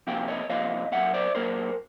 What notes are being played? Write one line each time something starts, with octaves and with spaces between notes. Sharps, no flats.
C3 F3 A#3 F5 G5
C#5 D#5
C3 F3 A#3 D#5 F5
A#2 F#3 A#3 E5 F#5
C5 D5
A#2 F#3 A#3 A#4 C5